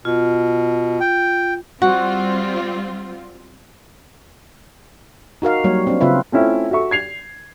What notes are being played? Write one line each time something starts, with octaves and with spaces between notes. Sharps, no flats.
B2 F4
G5
G3 C4 F4 F#4
D#4 F#4 A#4 F5
F#3 G3 A#3 C#5
C4 D4
C#3 C4 F4 B4 E5
A3 C4 C#4 E4 F4
F#4 A4 E5 C#6
G#6 C7 F7